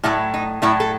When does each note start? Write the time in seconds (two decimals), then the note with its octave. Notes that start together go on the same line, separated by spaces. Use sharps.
0.03 A2 F#3 A3 E4
0.34 D#4
0.62 A2 F#3 A3 E4
0.80 A4